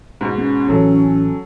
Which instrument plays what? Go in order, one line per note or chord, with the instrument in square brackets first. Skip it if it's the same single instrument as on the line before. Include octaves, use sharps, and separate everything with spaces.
[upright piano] G#2 B2
[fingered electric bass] B3 [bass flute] C#4
[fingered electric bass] A1 A2 E3 [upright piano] F#3 A4